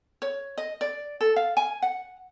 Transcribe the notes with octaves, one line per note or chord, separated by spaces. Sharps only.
C#5
D#5
D5
A4
F5
G#5
F#5